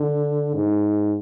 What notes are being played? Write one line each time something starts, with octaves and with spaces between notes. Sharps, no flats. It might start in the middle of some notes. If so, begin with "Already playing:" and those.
Already playing: D3
G#2